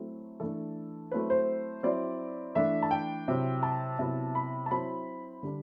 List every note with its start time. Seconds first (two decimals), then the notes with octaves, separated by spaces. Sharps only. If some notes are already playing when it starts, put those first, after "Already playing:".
Already playing: F#3 A3 C4 E4
0.40 E3 A3 D4 A4
1.11 F#3 A3 C4 E4 B4
1.30 C5
1.83 F#3 C4 E4 D5
2.55 E3 A3 D4 E5
2.82 A5
2.91 G5
3.28 C3 F#3 C4 E4
3.63 A5
3.99 C3 F#3 B3 E4
4.35 B5
4.66 A5
4.71 F#3 C4 E4 B5
5.43 D3 G3 D4